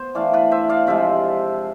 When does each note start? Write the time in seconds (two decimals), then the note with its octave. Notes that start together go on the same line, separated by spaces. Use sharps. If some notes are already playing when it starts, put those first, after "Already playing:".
Already playing: B3 C5
0.15 E3 A3 D4 D5 F5
0.33 B4 D5
0.51 C5 E5
0.69 D5 F5
0.87 C3 F3 G#3 C5 E5